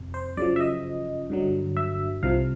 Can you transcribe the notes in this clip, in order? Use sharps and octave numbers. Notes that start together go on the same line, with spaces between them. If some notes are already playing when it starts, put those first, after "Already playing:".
Already playing: F2 C3
C5
F#2 C#3 F3 D5
E5
D#5
G2 D3 F#3
E5
C2 C3 F3 F5